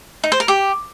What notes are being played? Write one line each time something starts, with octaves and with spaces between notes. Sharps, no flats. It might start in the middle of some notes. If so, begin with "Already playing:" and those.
D#4
C5
A#4
G4